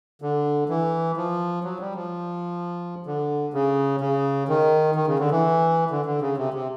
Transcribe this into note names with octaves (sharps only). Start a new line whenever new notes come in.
D3
E3
F3
F#3
G3
F3
D3
C#3
C#3
D#3
D#3
C#3
D3
E3
D3
D3
C#3
C3
C3